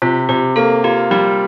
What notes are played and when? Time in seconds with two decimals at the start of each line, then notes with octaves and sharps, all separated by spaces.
0.02 C3 F4
0.29 C3 G4
0.56 A#3 A4
0.84 F4 G4
1.11 G3 G4